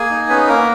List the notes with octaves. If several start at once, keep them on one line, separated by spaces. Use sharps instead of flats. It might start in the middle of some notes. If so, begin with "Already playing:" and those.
Already playing: A#3 G#4 G#5
D#4
B3 C#4 B4
A#3 A#4